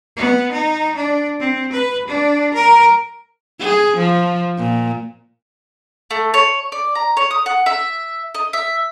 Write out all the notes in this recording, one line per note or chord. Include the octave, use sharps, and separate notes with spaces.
B3
D#4
D4
C4
B4
D4
A#4
G#4
F3
A#2
A3
C#5
D5
A#5
C#5
D#6
F#5
E5
D#5
E5